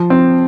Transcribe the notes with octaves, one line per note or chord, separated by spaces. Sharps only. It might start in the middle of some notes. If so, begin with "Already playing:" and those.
Already playing: F3
C4